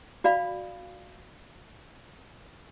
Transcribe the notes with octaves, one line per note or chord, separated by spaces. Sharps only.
F#4 D5 F5 B5